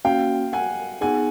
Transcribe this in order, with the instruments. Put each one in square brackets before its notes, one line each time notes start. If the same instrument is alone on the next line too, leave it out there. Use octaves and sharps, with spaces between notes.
[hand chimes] A#3 C#4 F#4 [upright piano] F5 G5
[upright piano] F#5 G#5
[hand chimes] B3 D#4 G#4 [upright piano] F#5 G#5